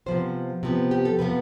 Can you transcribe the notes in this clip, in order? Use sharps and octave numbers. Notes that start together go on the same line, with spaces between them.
C3 F3 B3 C5
C3 F3 B3
G4
A4
C3 F3 B3 B4